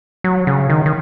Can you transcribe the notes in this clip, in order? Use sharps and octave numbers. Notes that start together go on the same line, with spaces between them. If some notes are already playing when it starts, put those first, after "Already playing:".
F#3
C#3
D#3
D#3